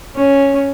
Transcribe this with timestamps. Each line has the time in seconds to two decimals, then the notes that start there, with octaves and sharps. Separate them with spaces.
0.16 C#4